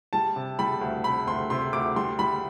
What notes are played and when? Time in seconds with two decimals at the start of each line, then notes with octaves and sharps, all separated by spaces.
0.13 G3 A5
0.36 C3
0.59 G3 B5
0.81 D2
1.04 C3 B5
1.27 D2 C6
1.50 C3 C6
1.73 D2 D6
1.96 G3 C6
2.19 G3 B5